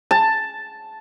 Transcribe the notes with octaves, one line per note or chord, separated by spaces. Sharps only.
A5